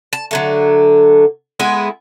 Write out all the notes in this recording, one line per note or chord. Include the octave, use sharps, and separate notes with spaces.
A5
D3 F#3 A3
G#3 B3 E4 G#5